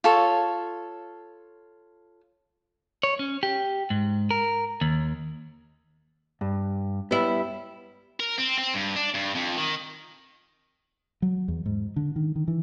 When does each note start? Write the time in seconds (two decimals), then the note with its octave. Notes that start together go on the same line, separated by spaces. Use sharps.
0.04 F4 A4 C#5
3.03 C#5
3.19 C#4
3.43 G4
3.90 G#2
4.31 A#4
4.81 D#2
6.41 G2
7.11 G3 B3 E4
8.20 A#4
8.38 C4
8.58 C4
8.74 G2
8.96 D4
9.14 G2
9.35 F2
9.57 D#3
11.22 F#3
11.48 E2
11.66 G#2
11.96 D3
12.16 D#3
12.36 D#3
12.48 E3